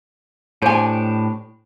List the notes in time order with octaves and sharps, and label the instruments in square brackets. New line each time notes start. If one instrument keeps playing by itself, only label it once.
[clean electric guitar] A2 D4 G4 [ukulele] C5 G#5